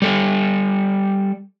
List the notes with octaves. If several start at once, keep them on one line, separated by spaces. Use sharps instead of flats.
G3 A4